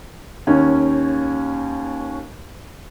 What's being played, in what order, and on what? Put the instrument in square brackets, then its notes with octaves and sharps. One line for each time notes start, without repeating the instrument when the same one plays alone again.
[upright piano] D#2 C#4